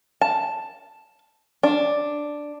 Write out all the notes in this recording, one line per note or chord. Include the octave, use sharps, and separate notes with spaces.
A5
D4